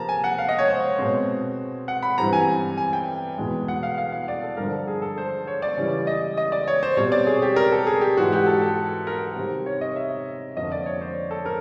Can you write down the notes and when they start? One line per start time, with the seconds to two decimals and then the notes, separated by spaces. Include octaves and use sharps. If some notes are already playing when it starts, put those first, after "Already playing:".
Already playing: C3 F3 A#3 A5 A#5
0.09 G#5
0.24 F#5
0.38 F5
0.48 D#5
0.59 C#5
0.68 C5
0.99 B2 G#3 C4
1.88 F#5
2.03 B5
2.18 G2 E3 G3 C4 A#5
2.33 G#5
2.77 G#5
2.93 G5
3.38 E2 B2 G#3
3.68 F#5
3.83 F5
3.97 F5
4.12 F5
4.28 D5
4.43 A4
4.57 G2 D3 F3 A#4
4.73 A4
4.87 G#4
5.02 A4
5.18 C5
5.47 C#5
5.62 D5
5.77 C#3 E3 G3
6.07 D#5
6.37 D#5
6.52 D5
6.68 C#5
6.83 C5
6.97 B2 G3 C4 C#5
7.12 D5
7.27 G#4
7.42 G4
7.56 A#4
7.72 A4
7.87 G#4
8.01 G4
8.17 G#2 E3 G#3 F#4
8.32 G4
8.46 A4
8.62 A4
9.07 A#4
9.36 C3 D#3 G3 C4
9.66 C#5
9.81 D#5
9.96 E5
10.57 F2 D3 F3 A#3 D#5
10.72 D5
10.86 C#5
11.01 C5
11.31 A4
11.46 A#4